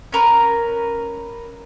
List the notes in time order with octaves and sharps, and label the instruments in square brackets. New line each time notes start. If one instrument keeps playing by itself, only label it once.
[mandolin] C#4 A#4 B4